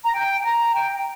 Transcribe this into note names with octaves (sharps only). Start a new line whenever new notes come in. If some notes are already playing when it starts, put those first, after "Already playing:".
A#5
G5
G5
A#5
G5
G5